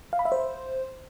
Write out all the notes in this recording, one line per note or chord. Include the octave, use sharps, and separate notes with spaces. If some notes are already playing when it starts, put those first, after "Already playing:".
F5
B5
E5
C5